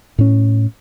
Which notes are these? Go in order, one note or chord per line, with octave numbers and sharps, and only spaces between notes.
A2 C#4